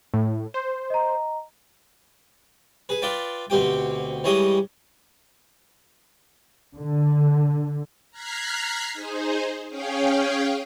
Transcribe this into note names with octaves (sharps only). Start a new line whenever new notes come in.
A2
C5
D#5 A#5
G#4 B4
F4 B4 D5 E5 G5
D2 B2 C4 G4 G5
E3 G3 G#3 C#5 G5 D#6
D3
A#5 F6 F#6 G#6 B6 C7
D#4 G#4 C5
C#4 G#4 C#5 F5 G5